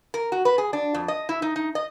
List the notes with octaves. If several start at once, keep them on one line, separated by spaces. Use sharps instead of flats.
A#4
F#4
B4
G#4
D4
F2
D#5
E4
D#4
D#4
D#5